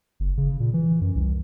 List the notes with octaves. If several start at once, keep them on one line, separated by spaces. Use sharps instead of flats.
F#1
C#3
A#2
E3
F#2
C2